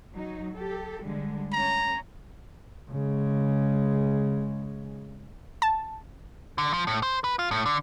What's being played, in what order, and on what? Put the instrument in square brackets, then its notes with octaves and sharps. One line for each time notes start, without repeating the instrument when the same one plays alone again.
[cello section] F#3 D#4
G4 A4
D3 G3 G#3
[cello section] A3 C#4 [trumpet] A#5
[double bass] C#3 G#3
[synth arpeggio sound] A5
[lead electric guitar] D3
F3
A2
C5
B4
F4
A2
D3